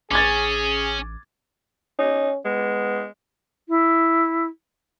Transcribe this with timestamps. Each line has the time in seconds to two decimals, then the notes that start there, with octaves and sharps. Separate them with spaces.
0.11 A1 C#4 G#4 D6 G#6 A6
1.99 C#4 D#4
2.45 G#3 B3
3.69 E4